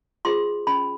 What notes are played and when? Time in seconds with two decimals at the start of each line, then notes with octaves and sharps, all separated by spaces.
0.25 F4 G#4 C5 C6
0.67 C#4 B5